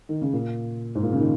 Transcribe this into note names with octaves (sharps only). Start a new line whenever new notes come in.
D#3
C#3
A#2
G#2
A#2
C#3
D#3